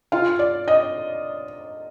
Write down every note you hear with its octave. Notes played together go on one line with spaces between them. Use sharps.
F4 F5
D5
D#5